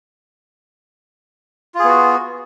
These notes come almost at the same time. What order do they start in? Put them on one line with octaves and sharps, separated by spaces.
F4 G#4 B3 F#4